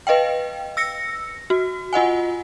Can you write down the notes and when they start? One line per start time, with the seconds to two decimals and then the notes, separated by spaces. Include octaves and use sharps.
0.07 B4 D#5 F5 G5
0.77 E6 A#6 C#7
1.50 F#4
1.93 F4 D#5 F#5 G#5